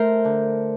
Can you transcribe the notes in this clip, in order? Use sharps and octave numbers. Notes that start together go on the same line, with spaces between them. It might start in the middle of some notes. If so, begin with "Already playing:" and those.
Already playing: A3 A#4 C5
D3